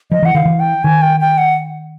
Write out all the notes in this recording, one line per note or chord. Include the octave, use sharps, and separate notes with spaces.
F3 D#5
E3 F#5
D#3 F5
E3
G5
D#3 G#5
G5
G5
F#5